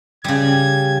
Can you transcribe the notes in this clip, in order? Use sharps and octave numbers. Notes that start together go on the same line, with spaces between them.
C#3 G3 G#6